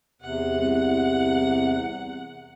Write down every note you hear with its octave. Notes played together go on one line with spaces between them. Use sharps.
E2 C3 F#5
C2